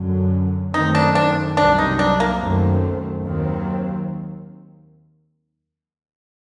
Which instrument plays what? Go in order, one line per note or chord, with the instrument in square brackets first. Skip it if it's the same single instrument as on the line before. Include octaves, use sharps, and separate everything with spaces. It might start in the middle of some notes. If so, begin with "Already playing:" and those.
Already playing: [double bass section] F#2 D3 F#3
[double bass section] F#2 D#3 A3 C4 [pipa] D#4
[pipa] D4
D4
[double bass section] C2 C3 F#3 C4 [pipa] D4
[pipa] D#4
D4
A#3
[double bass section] F#2 D#3 A3 C4
D#2 D#3 F#3 C4